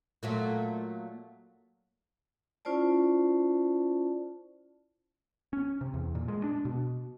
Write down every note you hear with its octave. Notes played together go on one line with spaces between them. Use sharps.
A#2 F#3 A3
C#4 E4 F4 C5 D5 A5
C#4
C3
E2
A#2
G#3
D4
B2